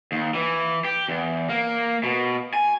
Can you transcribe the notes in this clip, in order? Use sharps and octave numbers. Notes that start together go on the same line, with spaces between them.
D#2
E3
G4
E2
A#3
B2
G#5